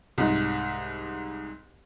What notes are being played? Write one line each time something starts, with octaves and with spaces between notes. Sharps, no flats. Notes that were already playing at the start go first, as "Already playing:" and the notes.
C2 G#2